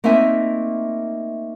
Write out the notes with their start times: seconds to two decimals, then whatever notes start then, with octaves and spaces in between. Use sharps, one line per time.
0.04 A3 A#3 C4 D#4 E5 G#5